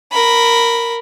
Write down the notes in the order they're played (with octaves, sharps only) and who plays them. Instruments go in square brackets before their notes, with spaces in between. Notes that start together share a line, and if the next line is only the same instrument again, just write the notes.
[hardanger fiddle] A#4 B5